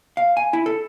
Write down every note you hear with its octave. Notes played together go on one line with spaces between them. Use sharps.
F5
G#5
E4
A4